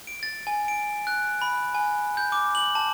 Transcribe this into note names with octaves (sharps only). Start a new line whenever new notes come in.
D7
A6
G#5
D7
F#6
B5
G#5
G6
D6
F#7
A5